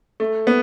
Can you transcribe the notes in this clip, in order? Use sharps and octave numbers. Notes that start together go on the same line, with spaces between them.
A3
B3